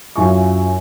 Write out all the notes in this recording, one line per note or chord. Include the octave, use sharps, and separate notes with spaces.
F#2 E4 F4 G#5 C#6